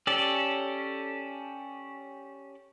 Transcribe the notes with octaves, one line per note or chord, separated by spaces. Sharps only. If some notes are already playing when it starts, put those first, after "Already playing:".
C#4 G4 A4 D5